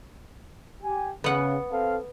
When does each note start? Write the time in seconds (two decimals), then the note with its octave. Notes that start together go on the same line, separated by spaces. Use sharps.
0.83 G4 G#5
1.24 C#3 B3 F#5
1.72 C4 A4 F5